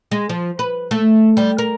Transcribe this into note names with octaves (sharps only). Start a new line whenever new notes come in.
G#3
F3
B4
A3
G3
A#4